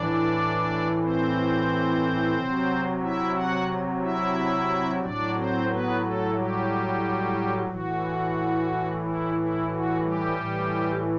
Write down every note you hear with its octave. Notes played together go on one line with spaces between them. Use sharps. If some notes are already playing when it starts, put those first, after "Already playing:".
Already playing: A2 E3 D4 D5
C4 C5
C3 F#3
E4 E5
F#4 F#5
E4 E5
A2 F#3 D4 D5
C4 C5
B3 B4
A3 A4
G3 G4
A2 E3 F#4
E4
E4
F#4
G3 G4
A2 E3